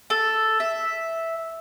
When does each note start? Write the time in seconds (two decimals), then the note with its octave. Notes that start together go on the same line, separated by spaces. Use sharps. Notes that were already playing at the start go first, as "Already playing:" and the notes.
0.10 A4
0.60 E5